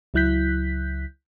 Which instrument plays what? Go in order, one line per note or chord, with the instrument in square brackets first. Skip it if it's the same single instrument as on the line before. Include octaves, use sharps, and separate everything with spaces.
[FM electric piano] C#2 F#3 E4 F#6 G6 B6